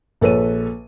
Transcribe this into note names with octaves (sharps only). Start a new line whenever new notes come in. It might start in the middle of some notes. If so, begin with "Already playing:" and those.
A#1 A4 B4 C#5 D#7